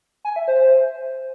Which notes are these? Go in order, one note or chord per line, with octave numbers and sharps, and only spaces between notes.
G#5
E5
C5